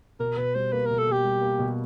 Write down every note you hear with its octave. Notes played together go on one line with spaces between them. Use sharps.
B2 A#4
B2 B4
G3 C5
A#3 B4
B2 A#4
A4
B2
G4
G3
A#3
B2